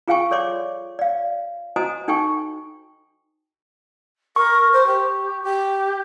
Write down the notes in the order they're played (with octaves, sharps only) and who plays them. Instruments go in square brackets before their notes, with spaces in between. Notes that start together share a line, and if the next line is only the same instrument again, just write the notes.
[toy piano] F4 G#4 F5 G5 G#5 C#6
A4 C#5 D5 C6 D6
D5 F5
F#4 C5 D#5 G#5 A#5 D#6
D#4 A4 G5 G#5 C#6
[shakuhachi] A#4 [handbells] C#6
[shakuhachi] C5
G4
G4